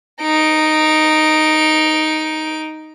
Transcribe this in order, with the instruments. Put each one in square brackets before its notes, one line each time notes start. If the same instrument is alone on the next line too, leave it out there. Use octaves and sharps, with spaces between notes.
[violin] D#4 D7